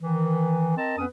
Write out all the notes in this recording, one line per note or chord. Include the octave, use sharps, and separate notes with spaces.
D#3 E3
C4 A#4 D#5 A5
F2 B3 C#4 B4 D#6